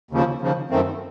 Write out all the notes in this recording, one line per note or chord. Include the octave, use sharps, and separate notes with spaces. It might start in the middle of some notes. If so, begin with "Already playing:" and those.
D#2 C#3 F3
D#2 C#3 F3
F#2 D#3 A3 C4